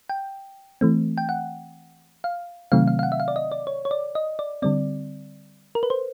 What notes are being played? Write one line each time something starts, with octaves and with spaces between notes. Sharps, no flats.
G5
E3 A3 C4
G5
F#5
F5
C3 D#3 F#3 A3 C4 F5
F5
F5
F#5
E5
F5
D5
D#5
D5
C#5
C#5
D5
D#5
D5
D3 G3 C4 D5
A#4
B4
C5